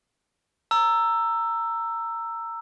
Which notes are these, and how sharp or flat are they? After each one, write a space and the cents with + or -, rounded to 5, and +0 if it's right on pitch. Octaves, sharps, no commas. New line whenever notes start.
A#5 -15 E6 +10